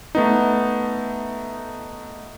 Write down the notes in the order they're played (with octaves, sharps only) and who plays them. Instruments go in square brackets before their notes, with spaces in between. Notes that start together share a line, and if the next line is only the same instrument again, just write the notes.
[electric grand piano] A3 B3 D#4